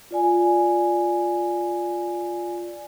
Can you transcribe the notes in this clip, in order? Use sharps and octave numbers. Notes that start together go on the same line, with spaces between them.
F4 D5 G#5